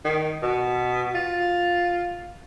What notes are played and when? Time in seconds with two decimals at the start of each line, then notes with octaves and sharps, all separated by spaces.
0.04 D#3
0.43 B2
1.15 F4